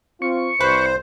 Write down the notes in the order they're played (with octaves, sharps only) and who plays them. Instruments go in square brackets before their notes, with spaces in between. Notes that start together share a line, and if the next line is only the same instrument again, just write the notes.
[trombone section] C4 F4 [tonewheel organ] C#6
[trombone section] C2 [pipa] B4 [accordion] C5